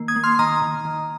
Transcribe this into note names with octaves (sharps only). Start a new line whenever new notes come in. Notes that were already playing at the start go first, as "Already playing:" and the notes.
Already playing: D#3 A#3
D#6 G#6
A#3
C6 F6
C6
D#3 A#5 D#6
D#3
D#3